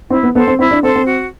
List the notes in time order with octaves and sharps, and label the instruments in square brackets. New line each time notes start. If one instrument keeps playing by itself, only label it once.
[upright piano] C4 [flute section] E4
[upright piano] B3
[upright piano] B3 [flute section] A4 C5
[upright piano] C4
[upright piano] C4 [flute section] E4
[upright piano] D4
[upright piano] C4 [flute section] A4 C5
[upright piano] C4
[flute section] F#4